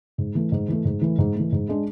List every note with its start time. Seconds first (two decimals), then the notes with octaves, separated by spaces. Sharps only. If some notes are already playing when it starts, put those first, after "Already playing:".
0.18 G#2
0.35 E3 A3
0.52 G#2
0.68 E3 A3
0.85 G#2
1.01 E3 A3
1.18 G#2
1.35 E3 A3
1.52 G#2
1.69 G#3 D4